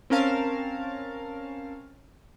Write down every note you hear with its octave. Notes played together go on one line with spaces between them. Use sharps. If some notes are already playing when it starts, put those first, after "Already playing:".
C4 C#4 A#4 F5 A5